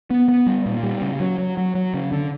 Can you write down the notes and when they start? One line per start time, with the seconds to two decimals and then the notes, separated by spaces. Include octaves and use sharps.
0.11 B3
0.28 B3
0.47 G3
0.66 A#2
0.83 G3
1.02 C#3
1.20 F#3
1.38 F#3
1.57 F#3
1.75 F#3
1.94 C#3
2.12 D3